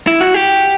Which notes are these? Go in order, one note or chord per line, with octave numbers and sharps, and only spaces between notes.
E4
F#4
G4